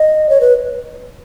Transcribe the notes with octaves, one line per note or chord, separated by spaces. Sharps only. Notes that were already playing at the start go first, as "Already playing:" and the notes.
Already playing: D#5
C#5
B4